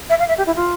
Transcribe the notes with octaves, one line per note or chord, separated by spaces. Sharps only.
E5
F5
E5
G4
E4
F4